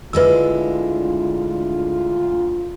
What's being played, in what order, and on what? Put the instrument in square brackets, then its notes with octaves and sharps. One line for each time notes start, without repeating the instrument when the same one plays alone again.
[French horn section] D2 F4 [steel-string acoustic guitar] D3 G#3 E4 [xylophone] B4 E6